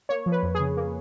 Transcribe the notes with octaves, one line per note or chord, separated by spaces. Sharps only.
A#3 C#5
F3
B4
F2
C#3 G#4
A#3